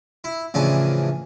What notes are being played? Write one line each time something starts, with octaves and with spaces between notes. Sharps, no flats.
E4
A1 C#3 E3 F3 D4 G#5